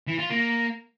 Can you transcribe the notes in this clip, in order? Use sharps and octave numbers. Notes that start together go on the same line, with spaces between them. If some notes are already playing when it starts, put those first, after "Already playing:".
E3
F4
A#3